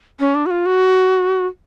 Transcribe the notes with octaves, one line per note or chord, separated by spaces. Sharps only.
C#4
D4
F#4
F4
F#4